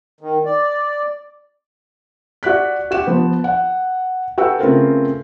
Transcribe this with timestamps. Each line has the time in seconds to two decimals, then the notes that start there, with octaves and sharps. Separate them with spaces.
0.21 D#3
0.46 D5
2.43 F#4 D5 F#6 B6
2.91 F#4 G4 E7
3.07 F3 B3
3.44 F#5
4.38 F#4 A4 B4 G5 E6
4.59 C#3 A3 C4 F4 A#4 B4